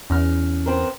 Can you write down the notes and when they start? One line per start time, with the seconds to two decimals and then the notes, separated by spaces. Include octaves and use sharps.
0.10 E2 C#4 F6
0.66 B3 C4 A#4